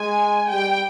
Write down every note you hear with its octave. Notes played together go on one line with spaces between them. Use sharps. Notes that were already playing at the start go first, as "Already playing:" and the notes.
Already playing: G#3 G#5
G3 G5